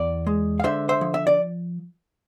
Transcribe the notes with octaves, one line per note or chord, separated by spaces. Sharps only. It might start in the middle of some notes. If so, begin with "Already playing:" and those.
Already playing: E2 D5
G#3
F5
D3 C5 E5
C5 E5
F3
E5
D5